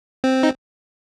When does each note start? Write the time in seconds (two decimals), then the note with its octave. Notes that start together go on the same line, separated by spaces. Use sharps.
0.24 C4
0.43 D#4